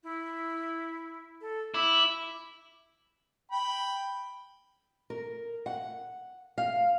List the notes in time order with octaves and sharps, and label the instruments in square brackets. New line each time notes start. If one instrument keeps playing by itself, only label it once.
[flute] E4
A4
[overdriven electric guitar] E4 [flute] D6
[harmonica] G5 B5
[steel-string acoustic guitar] A#4
F#5
F5